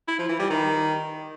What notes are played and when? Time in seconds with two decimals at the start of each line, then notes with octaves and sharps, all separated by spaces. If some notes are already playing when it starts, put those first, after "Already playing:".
0.08 E4
0.19 F3
0.29 E3
0.40 G3
0.50 D#3